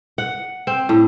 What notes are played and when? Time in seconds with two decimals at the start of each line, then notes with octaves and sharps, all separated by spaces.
0.18 F#5
0.67 C4
0.89 A2